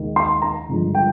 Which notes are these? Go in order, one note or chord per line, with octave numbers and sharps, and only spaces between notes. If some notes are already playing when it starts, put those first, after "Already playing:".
Already playing: D#2 D#3 G#3
C6
A#5
G1 G2 F3 G#3
G5